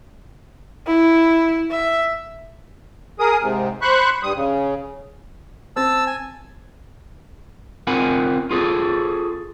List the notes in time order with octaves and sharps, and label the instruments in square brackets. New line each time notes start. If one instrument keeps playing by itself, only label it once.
[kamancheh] E4
E5
[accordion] G#4 A#4 D#6
G#2 C3
C5 B5 C#6 F#6
G2 G3 D#6
C#3
[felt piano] C4 [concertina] A5 E6
[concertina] G#5
[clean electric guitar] C4 F4 A#4 F#5 G#5 B5
F4 G#4 A4